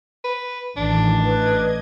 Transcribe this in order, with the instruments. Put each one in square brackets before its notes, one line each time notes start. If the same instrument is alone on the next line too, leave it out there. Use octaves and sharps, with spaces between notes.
[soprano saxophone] B4
[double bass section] A1 [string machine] D#3 E3 [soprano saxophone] D4
[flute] B4 [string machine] D#5 G#6